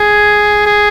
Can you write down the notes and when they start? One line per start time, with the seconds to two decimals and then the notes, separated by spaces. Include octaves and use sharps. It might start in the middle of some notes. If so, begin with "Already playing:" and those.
Already playing: G#4
0.66 G#4